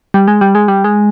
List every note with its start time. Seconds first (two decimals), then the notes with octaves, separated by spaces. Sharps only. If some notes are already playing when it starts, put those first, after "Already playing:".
0.14 G3
0.28 G#3
0.41 G3
0.55 G#3
0.68 G3
0.84 G#3